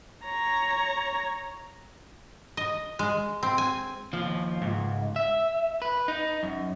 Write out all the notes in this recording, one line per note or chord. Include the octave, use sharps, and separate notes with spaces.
C#5 A#5
D#5
G#3
C4
G#5
D#2 F3
C#2 G#2
E5
B4
D#4
F#2